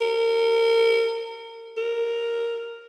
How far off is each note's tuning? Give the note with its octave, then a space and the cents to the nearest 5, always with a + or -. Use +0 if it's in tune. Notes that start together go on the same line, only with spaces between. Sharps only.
A#4 -30
A#4 +0